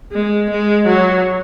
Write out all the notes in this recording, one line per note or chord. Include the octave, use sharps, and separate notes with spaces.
G#3
G#3
F#3